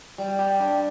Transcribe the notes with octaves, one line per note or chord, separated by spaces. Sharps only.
G3
G4
D4